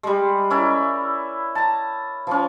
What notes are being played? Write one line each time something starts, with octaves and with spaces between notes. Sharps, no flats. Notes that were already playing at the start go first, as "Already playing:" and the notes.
G3 G#3
C#4 E4 A#4 D5
A5 A#5
F3 C#4